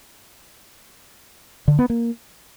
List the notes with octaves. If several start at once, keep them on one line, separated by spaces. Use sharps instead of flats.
D3
B3
A#3